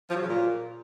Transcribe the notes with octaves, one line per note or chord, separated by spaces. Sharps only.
F3
F#3
C#3
A#2